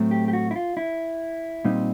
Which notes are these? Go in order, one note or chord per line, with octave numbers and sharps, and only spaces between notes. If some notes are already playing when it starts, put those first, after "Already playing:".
Already playing: A2 F#3 A3 C4
G4
G4
F#4
E4
F4
E4
A#2 G3 C4 D#4